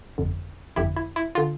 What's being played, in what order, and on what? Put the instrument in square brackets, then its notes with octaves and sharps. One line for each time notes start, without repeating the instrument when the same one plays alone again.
[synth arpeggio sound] G1 F2 D3
G1 F2 D3 E4 G4
E4
E4
D3 F4